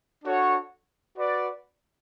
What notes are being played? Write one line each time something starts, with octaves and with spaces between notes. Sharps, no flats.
D4 F#4 A4 C#5 F#5
F#4 B4 D5